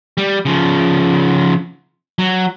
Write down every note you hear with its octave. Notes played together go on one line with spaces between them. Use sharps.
G3
C#3 F3
F#3